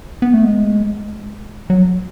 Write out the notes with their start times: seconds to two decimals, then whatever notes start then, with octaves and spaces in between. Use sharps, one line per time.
0.22 B3
0.34 A3
0.45 G#3
1.70 F#3